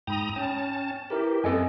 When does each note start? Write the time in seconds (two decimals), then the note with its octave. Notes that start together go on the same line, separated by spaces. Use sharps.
0.07 G#2 G5 A#5 B5 D#6
0.36 C#4 G5 A5
1.10 E4 G4 A#4 B4
1.44 F#2 C4 A4 D#5 G#5